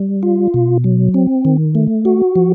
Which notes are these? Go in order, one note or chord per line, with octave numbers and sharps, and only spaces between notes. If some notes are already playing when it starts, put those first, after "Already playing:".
Already playing: G3
F4
B2
F#3
C4
D#3
A3
F#4
F3